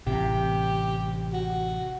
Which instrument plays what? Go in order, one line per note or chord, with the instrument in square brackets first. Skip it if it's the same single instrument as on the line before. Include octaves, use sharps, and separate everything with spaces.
[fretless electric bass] A1 C3 [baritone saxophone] G4
[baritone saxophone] F#4